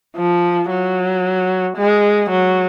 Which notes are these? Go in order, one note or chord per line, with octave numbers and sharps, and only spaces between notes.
F3
F#3
G#3
F#3